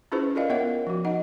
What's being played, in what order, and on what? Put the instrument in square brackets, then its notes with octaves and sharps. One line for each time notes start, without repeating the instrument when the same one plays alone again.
[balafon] C#4 E4 F4 G#4 B4 C5
F4 A4 A#4 D5 D#5 F5
B3 A#4 C#5 E5 F#5
F3 F#4
D#4 D#5 F#5